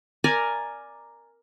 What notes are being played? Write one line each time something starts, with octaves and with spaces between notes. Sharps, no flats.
A#4 D5 G#5 A#5